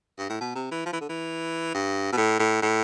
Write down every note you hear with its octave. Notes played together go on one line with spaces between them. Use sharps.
G2
A2
B2
C3
E3
F3
E3
D3
E3
G2
B2
A2
A2
A2